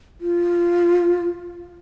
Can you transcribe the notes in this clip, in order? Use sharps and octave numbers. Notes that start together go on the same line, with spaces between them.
F4